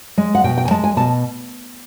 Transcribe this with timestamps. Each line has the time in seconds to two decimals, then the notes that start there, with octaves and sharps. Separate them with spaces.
0.18 G#3
0.35 F#5
0.44 B2 G5
0.58 G5
0.65 G#5
0.71 G#3 A5
0.84 G#5
0.97 B2 A5